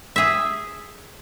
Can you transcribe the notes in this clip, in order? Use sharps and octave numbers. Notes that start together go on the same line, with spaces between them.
G#4 E5